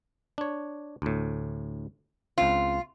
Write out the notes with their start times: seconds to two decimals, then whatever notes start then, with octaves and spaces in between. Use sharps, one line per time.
0.38 D4 C#5
1.02 D2 A2
2.38 C#2 C4 F4